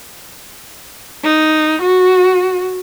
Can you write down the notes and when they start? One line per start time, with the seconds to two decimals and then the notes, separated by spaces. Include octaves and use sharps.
1.23 D#4
1.81 F#4